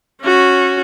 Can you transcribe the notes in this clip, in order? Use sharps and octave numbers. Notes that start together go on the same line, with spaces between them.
C#4 F#4